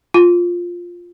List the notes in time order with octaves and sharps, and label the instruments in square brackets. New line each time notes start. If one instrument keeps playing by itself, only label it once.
[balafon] F4